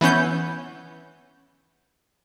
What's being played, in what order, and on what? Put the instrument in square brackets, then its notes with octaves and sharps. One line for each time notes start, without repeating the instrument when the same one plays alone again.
[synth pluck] E3 B3 C#4 G6